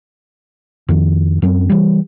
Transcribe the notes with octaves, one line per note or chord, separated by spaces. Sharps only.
F2 D#3
F#2 F#3 C4 C#4
E3 G3